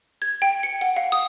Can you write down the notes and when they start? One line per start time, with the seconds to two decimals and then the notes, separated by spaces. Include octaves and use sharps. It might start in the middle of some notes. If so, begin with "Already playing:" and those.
0.22 G#6
0.42 G5
0.63 C#7
0.81 F#5
0.97 F5
1.12 D#6